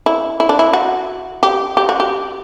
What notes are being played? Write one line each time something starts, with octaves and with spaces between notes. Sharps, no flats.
E4
E4
D4
E4
F#4
G4
G4
F#4
G4